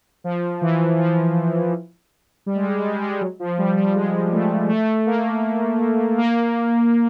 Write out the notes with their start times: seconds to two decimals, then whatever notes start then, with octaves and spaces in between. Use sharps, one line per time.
0.24 F3
0.62 E3
0.98 F3
2.46 G3
2.55 G#3
2.63 G3
2.71 G#3
2.78 G3
2.87 G#3
2.95 G3
3.02 G#3
3.10 G3
3.21 F#3
3.40 F3
3.58 G3
3.77 G3
3.95 G#3
4.33 A3
4.69 A3
5.06 A#3
6.18 A#3